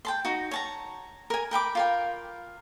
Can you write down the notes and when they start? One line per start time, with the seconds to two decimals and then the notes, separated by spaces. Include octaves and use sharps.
0.05 G5 A5 C6
0.25 D#4 F#4
0.51 C#5 A5 A#5
1.30 A#4 G#5
1.51 A#4 G5 B5 D6
1.75 F4 A#4 G5